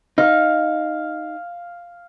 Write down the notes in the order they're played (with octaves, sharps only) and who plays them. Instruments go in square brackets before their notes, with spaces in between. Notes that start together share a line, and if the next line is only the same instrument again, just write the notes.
[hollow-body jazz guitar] D#4 [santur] F5